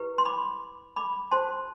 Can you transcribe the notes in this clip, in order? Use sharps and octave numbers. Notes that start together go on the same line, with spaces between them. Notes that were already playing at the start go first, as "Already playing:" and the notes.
Already playing: E4 G4 B4
C6
B5 D6
B5 D6
F#4 C5 A5 C6